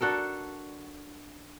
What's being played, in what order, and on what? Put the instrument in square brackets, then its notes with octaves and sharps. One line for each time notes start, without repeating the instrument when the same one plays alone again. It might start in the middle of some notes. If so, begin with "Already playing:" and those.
[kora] D4 F#4 A4 A#4